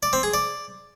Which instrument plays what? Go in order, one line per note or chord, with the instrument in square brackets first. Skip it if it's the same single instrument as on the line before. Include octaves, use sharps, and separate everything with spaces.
[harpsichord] D5
C4
G#4
D5